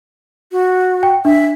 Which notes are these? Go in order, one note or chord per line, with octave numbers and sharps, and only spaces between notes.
F#4
G5
D4 E5